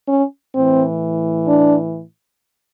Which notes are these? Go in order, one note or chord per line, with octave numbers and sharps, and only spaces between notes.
C#4
A2 E3 C4
D4